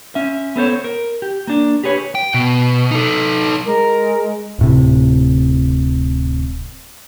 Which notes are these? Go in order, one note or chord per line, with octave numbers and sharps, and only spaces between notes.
C#4 E5
B3 A4 C5 C#5
A#4
G4
A#3 D4
G4 G#4 B4 C#5
G5
B2
D#4 A4
G#3 A#4
D1 A2 C3